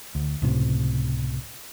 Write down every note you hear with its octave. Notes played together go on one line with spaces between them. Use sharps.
D2
C#2 A2 C3